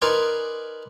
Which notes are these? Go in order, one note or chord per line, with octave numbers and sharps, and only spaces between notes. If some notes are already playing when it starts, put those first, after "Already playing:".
D#4 A#4 B4 D5 G#5 C6